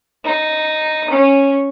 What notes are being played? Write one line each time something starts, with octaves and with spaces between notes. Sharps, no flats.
D#4
C#4